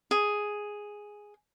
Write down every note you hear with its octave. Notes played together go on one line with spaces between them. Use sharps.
G#4